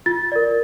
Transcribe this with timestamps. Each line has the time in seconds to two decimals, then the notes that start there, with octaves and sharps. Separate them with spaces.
0.06 F4 A6
0.32 A#4 D5